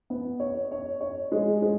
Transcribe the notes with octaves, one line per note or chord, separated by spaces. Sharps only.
B3
C#5
C#5
C#5
G#3
G#3